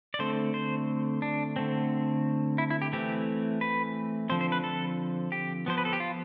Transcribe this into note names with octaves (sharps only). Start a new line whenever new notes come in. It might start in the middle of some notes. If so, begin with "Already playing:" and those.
D5
D3 A3 C4 C5
C5
D4
D3 A3 C4
E4
E4
G4
E3 A3 C4 G4
B4
D3 F3 C4 C5
C5
B4
A4
G4
F3 B3 C5
B4
A4
G4
F4